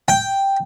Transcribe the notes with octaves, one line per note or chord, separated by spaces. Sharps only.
G5